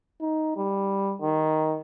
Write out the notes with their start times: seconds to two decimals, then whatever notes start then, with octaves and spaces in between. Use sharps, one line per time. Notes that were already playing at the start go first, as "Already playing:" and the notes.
0.21 D#4
0.57 G3
1.22 D#3